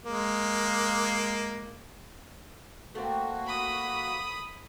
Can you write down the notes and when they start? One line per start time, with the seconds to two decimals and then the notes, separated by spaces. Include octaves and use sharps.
0.04 G#3 A#3
2.95 A3 A#3 C4 F#4
3.46 B5 D#6